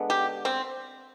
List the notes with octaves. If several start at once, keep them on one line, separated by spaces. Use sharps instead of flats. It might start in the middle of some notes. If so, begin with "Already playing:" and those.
Already playing: D3 G#3 B3
G4
C4